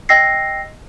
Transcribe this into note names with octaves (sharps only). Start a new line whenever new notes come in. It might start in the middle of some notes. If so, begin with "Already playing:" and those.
D#5 G5 E6 A#6 C7